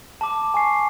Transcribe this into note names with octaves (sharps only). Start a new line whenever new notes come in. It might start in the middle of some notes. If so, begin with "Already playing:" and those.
A5 D6
G#5 C#6 C7